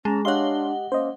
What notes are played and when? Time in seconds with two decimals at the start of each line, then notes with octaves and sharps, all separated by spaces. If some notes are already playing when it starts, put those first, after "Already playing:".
0.05 G#3 C#4 A5 A#5
0.25 D4 G4 C#5 D#5 F5 F#5 C6 G7
0.92 A#3 C#4 C5 D#5